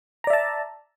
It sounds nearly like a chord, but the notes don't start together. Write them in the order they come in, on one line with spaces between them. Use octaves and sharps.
A#5 D5 E5 A5